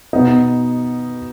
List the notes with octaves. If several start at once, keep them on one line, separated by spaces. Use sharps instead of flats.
B2 B3 D#4